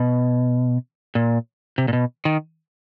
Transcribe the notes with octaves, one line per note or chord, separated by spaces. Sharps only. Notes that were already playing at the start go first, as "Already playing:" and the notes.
Already playing: B2
A#2
C3
A#2
B2
D#3